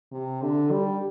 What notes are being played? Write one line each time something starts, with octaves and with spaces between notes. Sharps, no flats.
C3
D3
G3